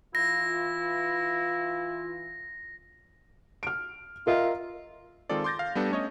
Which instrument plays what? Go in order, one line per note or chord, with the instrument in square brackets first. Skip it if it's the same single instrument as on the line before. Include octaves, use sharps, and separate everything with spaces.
[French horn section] E3 F4 [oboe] E4 [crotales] A#6
[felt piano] F6 D7
[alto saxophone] F4 [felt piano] A#4 D#5 E5
[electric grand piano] D#3 G#3 C4 F4 A4 D5
C6 D6 G6 A6 A#6
F5
G3 B3 D4 A4
A3 C#4 C#5 D#5